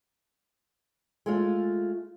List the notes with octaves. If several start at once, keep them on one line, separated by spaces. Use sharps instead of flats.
G#3 A3 F4